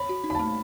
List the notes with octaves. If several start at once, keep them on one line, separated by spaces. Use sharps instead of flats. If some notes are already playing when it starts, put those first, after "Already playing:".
Already playing: C#5 B5
F#4
D#4
B5
A3 A5